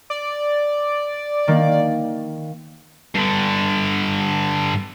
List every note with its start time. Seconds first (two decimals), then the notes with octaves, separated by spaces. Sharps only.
0.10 D5
1.48 D#3 A#3
3.15 G2 D3